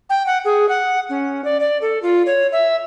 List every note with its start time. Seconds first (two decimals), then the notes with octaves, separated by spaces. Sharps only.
0.09 G5
0.27 F#5
0.45 G#4
0.69 F#5
1.09 C#4
1.44 D5
1.60 D5
1.81 A4
2.02 F4
2.26 C#5
2.52 E5